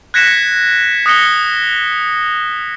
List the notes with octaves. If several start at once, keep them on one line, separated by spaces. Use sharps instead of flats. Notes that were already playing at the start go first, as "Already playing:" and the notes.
F#6 G#6 A#6 B6 C#7 E7
D#6 F#6 A#6 C#7 G7